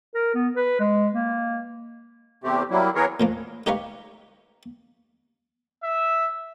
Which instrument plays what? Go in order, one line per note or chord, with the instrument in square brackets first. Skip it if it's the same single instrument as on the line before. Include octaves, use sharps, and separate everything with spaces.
[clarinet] A#4
B3
B4
G#3
A#3
[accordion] E2 C3 A3 C4 G4
F#3 G3 A#3 E4
E3 B3 G#4 A#4 C#5
[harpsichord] A#2 F3 A#3
D#4 G4 A#4 B4 C#5 F5
[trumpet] E5